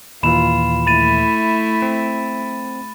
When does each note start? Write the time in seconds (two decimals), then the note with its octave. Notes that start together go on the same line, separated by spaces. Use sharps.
0.23 D#2 A#2 E3 F4 B5 E7
0.87 A3 E4 B5 A6 D#7
1.82 C4